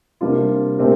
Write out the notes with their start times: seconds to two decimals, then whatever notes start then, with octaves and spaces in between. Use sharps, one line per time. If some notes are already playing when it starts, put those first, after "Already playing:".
0.21 C3 G3 A#3 D4 F4
0.78 A#2 A3 C4 G4 A#4